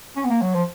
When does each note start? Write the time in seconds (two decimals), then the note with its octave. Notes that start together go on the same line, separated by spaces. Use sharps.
0.17 C#4
0.25 B3
0.30 A#3
0.42 F#3
0.54 F3